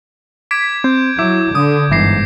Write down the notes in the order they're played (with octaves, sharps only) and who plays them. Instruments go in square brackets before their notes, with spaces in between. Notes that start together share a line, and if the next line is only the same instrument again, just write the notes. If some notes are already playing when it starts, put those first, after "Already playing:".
[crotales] D6 G#6 D7 [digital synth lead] B6
[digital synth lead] C4 [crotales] G6
[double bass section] F#3 [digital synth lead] E4 [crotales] D6
[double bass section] D3 [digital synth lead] D#6
[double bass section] G1 G#2 [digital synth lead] E3 [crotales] D6 A#6 C7